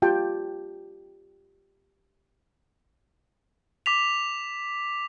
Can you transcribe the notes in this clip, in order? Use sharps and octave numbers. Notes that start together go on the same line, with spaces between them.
F4 G4 G5 A5
D6 B6 F7